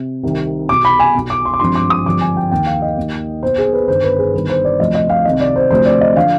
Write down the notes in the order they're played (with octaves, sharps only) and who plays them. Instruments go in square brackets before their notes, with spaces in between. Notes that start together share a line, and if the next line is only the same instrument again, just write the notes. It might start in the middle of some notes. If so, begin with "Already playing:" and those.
Already playing: [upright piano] C3
C2 C3 D#3
B1 B2 D6
B5
G#5
B1 B2
D6
C6
D6
G#1 G2 F3 C6
D6
D#6
G#1 G2 D3 F3 D6
G#5
G5
D#2 D#3 G5
F5
D#5
D#2 D#3
B1 B2 C5
G#4
B4
G1 G2 D#3 C5
B4
G#4
G1 G2 D#3 B4
C5
D5
D2 C3 F3 D#5
D#5
F5
C2 C3 D#3 D#5
D5
C5
D2 C3 F3 C5
D5
D#5
D3 F3 F5